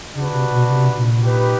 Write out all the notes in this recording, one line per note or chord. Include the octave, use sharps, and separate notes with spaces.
C#3 D4 F#4 B4
C3
B2
C3
A#2
D#4 G4 B4